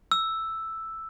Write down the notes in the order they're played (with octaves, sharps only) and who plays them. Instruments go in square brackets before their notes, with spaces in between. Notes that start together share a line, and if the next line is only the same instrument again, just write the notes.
[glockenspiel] E6